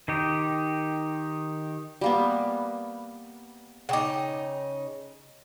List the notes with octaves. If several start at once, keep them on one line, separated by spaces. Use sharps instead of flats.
D#3 D#4 G4
G3 A#3 B3
C#3 D#4 F#5 G5 D6